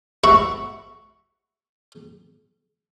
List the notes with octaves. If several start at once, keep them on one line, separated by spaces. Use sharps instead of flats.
F#4 E5 B5 C#6